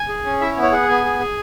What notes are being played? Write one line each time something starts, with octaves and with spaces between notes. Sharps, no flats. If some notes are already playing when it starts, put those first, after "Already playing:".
Already playing: G#5
G#4
C#4
E4 E5
C#5
B3
C#5
G#4 F#5
B3 G#5
G#4
G#4